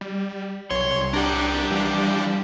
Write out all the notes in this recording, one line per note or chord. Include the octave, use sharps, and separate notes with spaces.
G3
B1 C#5 C6
C2
D4 G4 A#4 F#5
E3 F3 G3